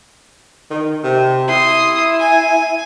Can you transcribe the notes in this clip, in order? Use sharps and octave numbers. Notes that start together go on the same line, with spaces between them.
D#3
C3
E4 C6 D#6
G#5